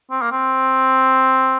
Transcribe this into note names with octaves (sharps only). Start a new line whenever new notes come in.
C4
A#3
C4